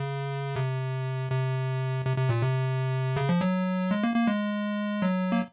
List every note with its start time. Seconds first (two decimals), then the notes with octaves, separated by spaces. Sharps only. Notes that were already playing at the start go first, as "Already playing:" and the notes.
Already playing: C#3
0.56 C3
1.31 C3
2.05 C3
2.17 C3
2.29 A#2
2.42 C3
3.16 C#3
3.29 F3
3.41 F#3
3.91 G#3
4.04 A#3
4.16 A#3
4.27 G#3
5.02 F#3
5.32 A#3